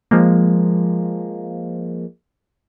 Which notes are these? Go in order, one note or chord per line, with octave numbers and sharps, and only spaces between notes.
F3 G#3 A#3